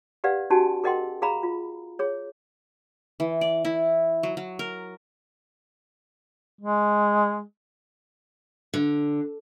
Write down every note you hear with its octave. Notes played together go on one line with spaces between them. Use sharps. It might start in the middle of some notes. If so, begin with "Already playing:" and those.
G4 B4 D5 F5 F#5
C#4 D#4 F#4 G4 G#5 A5
G#4 A#4 D#5 F#5 G5 C6
G#4 F5 A#5 B5
F4
G#4 C#5
E3
D5
E4
F#3
F#3
A#4
G#3
D3